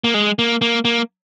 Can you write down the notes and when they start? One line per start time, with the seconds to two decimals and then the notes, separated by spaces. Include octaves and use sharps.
0.04 A#3
0.14 G#3
0.39 A#3
0.62 A#3
0.85 A#3